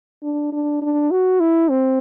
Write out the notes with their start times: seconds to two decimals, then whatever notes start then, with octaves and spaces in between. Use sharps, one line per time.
0.23 D4
0.53 D4
0.82 D4
1.11 F#4
1.40 E4
1.70 C4